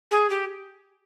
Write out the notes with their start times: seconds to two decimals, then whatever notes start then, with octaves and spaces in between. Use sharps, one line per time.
0.11 G#4
0.30 G4